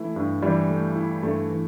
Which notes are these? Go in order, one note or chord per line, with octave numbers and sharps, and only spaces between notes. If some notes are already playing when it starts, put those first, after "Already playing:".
Already playing: E3 A3 E4
G2
E3 G3
A3
E4
G2 A3
E3